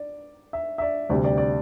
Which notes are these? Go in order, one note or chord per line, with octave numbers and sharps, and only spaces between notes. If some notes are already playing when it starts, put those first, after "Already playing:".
Already playing: D5
E5
E5
D5
D2 C3 G3 D5
D5
D5